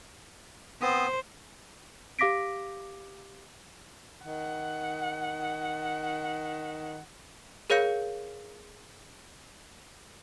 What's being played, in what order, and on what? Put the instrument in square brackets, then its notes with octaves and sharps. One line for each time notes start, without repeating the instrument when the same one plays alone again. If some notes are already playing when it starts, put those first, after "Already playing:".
[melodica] B3 C4 D#6 [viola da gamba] C5
[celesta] G4 F5 D6 A#6 B6 D7
[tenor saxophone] D#3 [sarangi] F#5
[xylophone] G#4 A#4 C#5 F5 G6 C#7